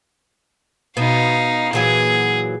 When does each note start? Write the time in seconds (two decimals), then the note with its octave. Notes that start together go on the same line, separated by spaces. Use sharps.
0.97 B2 D#4 F5
1.73 A#2 E3 F#3 G#4